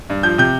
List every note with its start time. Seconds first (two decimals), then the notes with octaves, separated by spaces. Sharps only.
0.10 G2
0.23 F3 G6
0.38 C3 G6